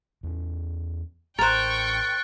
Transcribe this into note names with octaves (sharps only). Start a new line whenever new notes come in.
E2 C#4
A1 A#4 C5 G5 C#6 F#6 A6